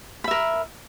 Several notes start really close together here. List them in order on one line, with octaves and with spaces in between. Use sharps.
B5 E5 A#4